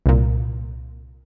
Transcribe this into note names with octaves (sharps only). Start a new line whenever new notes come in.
C2 A#2